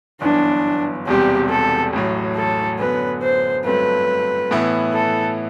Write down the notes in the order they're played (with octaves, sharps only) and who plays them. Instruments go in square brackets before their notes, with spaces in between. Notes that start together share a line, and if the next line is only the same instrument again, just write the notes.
[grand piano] G1 F#2 E3 B3 [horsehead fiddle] D4
[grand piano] E1 E2 C3 G3 C4 [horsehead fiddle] G4
[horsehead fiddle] A4
[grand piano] A1 A2 F#3
[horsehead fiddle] A4
[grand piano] F#2 D3 F#3 B3 [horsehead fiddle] B4
[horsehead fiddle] C5
[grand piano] G2 F#3 A3 C4 [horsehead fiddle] B4
[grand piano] A2 E3 B3 E4
[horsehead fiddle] A4